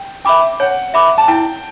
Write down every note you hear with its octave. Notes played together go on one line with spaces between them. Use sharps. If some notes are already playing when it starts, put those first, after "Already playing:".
Already playing: G5
E5 G5 B5 D6
C#5 F#5
E5 B5 D6
A5
E4 G5